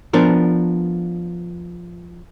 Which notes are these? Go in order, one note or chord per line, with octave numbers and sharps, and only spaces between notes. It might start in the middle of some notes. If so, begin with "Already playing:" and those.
F3 B3 D4 A#4 C5